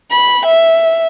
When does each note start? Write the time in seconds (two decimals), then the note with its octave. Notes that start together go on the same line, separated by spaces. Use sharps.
0.12 B5
0.45 E5